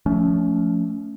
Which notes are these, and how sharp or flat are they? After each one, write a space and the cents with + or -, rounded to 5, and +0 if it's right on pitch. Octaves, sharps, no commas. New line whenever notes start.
F3 +0 A3 +0 C#4 +25